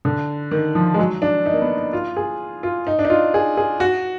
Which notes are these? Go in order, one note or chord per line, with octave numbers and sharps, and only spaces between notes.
D3
D#3
F3
G#3
F#3
D4
D#4
A#3
B3
D#4
F4
G#4
F4
D#4
D4
D#4
F4
G#4
G#4
F#4